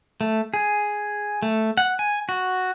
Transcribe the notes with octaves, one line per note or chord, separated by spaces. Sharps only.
A3
G#4
A3
F#5
G#5
F#4